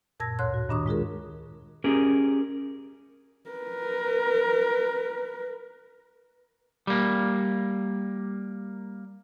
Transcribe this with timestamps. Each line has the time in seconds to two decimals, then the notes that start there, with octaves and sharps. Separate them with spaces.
0.20 F#2 A#2 A5 E6 G#6 A#6
0.39 D2 A2 C#5 C6 F#6
0.54 F#4
0.69 G2 D#3 D4 A#5 C#6 D#6
0.86 G#3 F4 G#4 A#4
1.84 C#4 G4 G#4 A#4
3.50 A#4 B4
6.87 G3 A#3